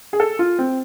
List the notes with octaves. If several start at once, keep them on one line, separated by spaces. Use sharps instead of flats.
G#4
A4
F4
C4